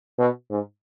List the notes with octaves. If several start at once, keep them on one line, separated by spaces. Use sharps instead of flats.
B2
G#2